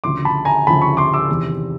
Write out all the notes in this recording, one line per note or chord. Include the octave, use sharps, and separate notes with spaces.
D2 C#3 F3 C6 D6
A5 B5
G#5 A#5
D2 C#3 F3 A5 B5
B5 C#6
C6 D6
D6 E6
E2 C3 D#3